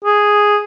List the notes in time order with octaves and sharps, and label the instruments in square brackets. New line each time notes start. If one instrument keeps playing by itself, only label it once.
[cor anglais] G#4